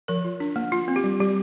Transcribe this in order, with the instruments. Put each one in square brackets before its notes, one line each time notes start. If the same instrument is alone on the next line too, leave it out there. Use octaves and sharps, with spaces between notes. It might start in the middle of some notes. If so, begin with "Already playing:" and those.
[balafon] F3 A#4
F4
D4
A#3
F4
C4
G4
G3
G3 G4